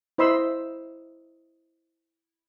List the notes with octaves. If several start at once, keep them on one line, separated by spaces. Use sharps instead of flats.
E4 C5 D#5 B5 C6 E6